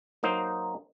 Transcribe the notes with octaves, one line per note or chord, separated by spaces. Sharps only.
F#3 A#3 D#4 C5